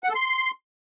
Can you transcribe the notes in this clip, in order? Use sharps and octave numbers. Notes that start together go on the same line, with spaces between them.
F#5
A4
C6